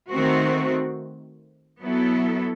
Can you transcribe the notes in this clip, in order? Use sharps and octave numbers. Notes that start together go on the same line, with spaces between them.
D#3 A3 C4 F#4
F#3 B3 E4 A4